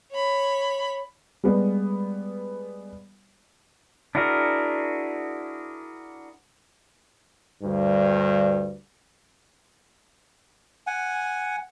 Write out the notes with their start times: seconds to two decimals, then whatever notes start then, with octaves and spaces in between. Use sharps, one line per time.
0.12 C#5 B5
1.44 G3 G#3 B3
4.15 D4 E4 F#4 G#4 A#4
7.63 D2 G2
10.87 F#5 G#5